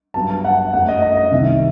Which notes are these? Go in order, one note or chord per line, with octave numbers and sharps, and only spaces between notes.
G2 F#3 B3 A5
A5
F#5
F#2 F#3 A3 F#5
D#5
D#5
D#5
C2 C3 D#3 E5